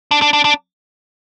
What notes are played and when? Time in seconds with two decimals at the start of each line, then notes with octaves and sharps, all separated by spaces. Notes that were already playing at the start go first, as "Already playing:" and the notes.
0.11 D4
0.22 D4
0.33 D4
0.45 D4